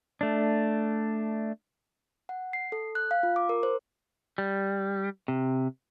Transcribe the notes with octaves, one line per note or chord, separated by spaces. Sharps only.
A3 D4
F#5
C7
A4
F#6
F5
F4
D6
A#4
C5
G3
C3